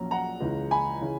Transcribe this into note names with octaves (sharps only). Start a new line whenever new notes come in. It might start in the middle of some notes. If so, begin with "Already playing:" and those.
Already playing: A#1 A#2 F#3 C#4 A#5
F#5 A#5
C#2 C#3 E3
G#5 B5
C#3 E3